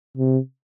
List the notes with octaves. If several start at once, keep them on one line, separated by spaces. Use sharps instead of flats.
C3